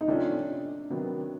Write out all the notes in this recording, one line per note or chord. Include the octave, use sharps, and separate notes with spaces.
D#4
C3 F3 A3 C#4 D4
C3 D#3 F#3 B3